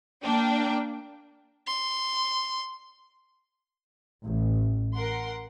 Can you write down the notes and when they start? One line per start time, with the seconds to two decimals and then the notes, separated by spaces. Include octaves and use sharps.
0.24 A#3 D4 G5
1.67 C6
4.23 A1
4.95 A#4 F#5 C6